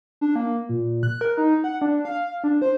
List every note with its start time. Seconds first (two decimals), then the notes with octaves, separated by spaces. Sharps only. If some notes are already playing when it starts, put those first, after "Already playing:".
0.21 D4
0.36 A#3
0.69 A#2
1.03 F#6
1.21 A#4
1.37 D#4
1.64 F#5
1.82 D4
2.05 F5
2.44 D4
2.62 C5